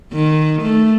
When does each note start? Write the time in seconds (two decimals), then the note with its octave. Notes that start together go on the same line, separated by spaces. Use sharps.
0.12 D#3
0.62 A3